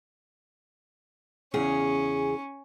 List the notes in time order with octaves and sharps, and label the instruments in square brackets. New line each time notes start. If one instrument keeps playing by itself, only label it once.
[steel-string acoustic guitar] E2 C#3 G#4 [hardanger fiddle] C#4